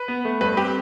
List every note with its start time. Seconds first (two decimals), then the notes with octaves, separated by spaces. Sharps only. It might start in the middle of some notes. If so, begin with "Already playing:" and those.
Already playing: B4
0.08 B3
0.25 A3
0.41 G2 B4
0.57 C4 G4